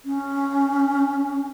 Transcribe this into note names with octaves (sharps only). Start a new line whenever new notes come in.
C#4